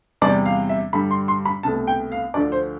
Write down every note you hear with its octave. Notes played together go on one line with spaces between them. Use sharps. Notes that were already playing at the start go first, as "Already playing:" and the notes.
E2 C3 G3 D5
F5
E5
G2 D3 G3 B5
C6
C6
B5
C2 B2 A3 A5
G5
F5
D2 D3 F3 D5
C5